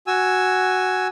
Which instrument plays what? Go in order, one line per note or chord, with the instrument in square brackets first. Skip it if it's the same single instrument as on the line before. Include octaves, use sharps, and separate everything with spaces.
[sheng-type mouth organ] F#4 G#5 E6